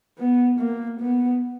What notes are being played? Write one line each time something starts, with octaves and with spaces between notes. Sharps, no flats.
B3
A#3
B3